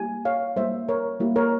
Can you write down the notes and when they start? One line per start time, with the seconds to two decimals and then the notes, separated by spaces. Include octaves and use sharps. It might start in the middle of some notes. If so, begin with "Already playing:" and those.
Already playing: G3 A#3 E4 G4 G#5
0.25 C#5 F5
0.56 G3 A#3 E4 G4 C5 E5
0.89 A#4 C#5
1.20 G3 A#3 E4 G4
1.36 A#4 C#5